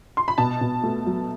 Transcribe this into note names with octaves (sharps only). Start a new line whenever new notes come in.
C6
B5
B2 A5
B2
A3
F#3